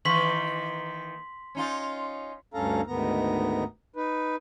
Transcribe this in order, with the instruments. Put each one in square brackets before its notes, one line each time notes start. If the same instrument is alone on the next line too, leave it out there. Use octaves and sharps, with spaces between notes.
[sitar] D#3 E3 A#3 [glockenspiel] C6 B6 F#7 [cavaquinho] C#6
[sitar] C#4 D#4 F4
[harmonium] D2 G2 C#4 A4 F5 A#5
D2 G#2 D#3 B3 A#5
D#4 B4